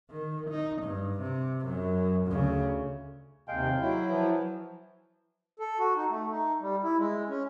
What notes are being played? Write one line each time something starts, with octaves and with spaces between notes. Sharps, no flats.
D#3
D#4
G2
C3
F#2
D2 C#3
D#2 C3 G#3 F5 G5
F#3 E4
E3 F3
A4
F#4
D#4
A3
D#4
G3
E4
G#3
C#4